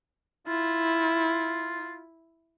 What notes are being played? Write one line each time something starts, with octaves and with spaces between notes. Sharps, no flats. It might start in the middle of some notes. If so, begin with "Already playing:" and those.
E4 F4